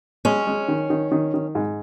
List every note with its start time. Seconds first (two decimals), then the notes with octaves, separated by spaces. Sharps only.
0.25 G#3 C#4
0.47 G#3
0.68 D#3
0.90 D#3
1.12 D#3
1.34 D#3
1.55 G#2